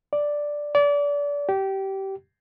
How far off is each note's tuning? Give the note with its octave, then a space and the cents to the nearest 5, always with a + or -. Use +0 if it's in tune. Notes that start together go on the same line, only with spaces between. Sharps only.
D5 +0
D5 -30
G4 -20